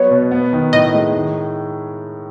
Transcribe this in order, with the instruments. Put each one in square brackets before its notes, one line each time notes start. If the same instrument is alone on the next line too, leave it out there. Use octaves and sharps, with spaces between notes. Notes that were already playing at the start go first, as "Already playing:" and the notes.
Already playing: [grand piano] F#3 B3 [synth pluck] C#5
[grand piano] B2
B3
D#3
[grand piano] A2 [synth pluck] D#5
[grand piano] G#3
D#3